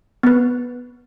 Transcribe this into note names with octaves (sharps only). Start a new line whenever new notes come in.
B3 B4